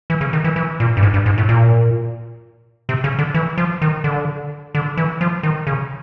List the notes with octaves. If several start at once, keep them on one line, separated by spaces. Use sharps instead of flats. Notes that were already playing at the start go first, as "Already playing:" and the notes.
E3
C#3
D#3
E3
E3
A#2
G2
G#2
G2
G#2
A2
A#2
C3
C#3
D3
E3
F3
D#3
D3
D3
E3
F3
D#3
C#3